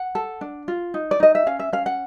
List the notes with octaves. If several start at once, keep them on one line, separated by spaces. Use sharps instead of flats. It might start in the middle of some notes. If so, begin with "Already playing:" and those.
Already playing: F#5
A4
D4
F4
D#4
D5
D#4 D#5
E5
C#4 F5
E5
C#4 F5
F#5